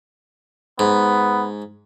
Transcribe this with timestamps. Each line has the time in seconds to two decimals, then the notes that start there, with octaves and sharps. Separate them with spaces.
0.79 G#2 B3